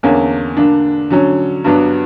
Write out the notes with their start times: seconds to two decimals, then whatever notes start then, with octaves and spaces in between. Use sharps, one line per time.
0.03 E2 D3 A#3 C#4
0.57 D3 A#3 D4
1.10 D3 F#3 C#4
1.64 G2 F#3 B3 D4